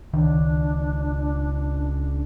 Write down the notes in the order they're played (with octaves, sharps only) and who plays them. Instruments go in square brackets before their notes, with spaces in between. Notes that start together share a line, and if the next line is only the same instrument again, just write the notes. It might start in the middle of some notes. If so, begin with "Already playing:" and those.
[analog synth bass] C#2 [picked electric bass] D#3 [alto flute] D4